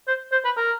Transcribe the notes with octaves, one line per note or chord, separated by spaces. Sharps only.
C5
C5
B4
A#4